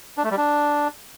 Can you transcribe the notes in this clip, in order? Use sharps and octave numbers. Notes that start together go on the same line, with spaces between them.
D4
A3
G3
D4